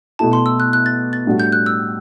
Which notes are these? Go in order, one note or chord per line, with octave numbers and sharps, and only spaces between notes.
B2 A3 E4 A5
C6
E6
F#6
F#6
A6
A6
A2 G3 D4 F#4
G6
F#6
E6